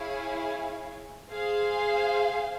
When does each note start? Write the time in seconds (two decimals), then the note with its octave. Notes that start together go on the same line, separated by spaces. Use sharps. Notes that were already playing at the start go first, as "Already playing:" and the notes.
Already playing: E4 G#4 C#5 F5 G#5
1.31 G#4 C5 F5 G#5